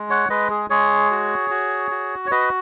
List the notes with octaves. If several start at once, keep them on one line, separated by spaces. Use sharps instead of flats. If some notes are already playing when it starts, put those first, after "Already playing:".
Already playing: G#3
C#5 F#5
G#3 B4 D#5
G#4
G#3 G#4 C#5
F#4
F#4
F#4
C#5
F#4 B4 D#5